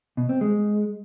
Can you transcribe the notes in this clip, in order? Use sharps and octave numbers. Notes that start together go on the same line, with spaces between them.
B2
C4
G#3